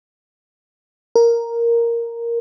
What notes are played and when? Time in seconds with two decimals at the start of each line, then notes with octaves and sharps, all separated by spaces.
1.15 A#4